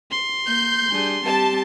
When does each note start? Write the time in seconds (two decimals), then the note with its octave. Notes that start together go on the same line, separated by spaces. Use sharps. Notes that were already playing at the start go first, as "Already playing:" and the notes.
0.11 C6
0.47 A#3 G6
0.91 G3 D4 G#4
1.25 G3 C4 G4 A5